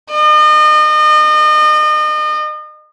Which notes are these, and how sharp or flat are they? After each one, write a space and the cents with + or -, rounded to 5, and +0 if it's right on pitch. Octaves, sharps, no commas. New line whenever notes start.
D#5 -35